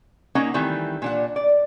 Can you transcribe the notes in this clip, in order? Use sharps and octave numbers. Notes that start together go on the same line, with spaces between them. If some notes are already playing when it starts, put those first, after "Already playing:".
A#3 C#4 D#4 F#5 A#5
D#3 E3 G3 A3 C4
A#2 D4 F#5
D5